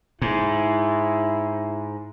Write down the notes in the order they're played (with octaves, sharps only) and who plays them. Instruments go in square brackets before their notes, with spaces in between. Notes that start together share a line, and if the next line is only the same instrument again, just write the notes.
[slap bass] G#2 [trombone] E4